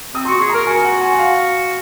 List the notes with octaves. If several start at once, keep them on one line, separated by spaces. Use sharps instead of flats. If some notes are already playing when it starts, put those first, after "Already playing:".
C4 D#6
C6
F#4
C#6
G#4
A#4 A#5
F#4 G#5
F#5
G#5
F#5
F5